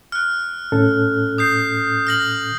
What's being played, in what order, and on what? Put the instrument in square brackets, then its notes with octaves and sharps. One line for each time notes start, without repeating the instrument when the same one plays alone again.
[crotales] F6 F#6
[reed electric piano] A2 C#4 A4
[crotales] D#6 G6 C7
F6 A#6 F#7